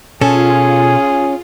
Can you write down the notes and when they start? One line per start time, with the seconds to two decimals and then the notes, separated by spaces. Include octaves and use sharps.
0.21 B2 C#4 F4 G#4 A4 A5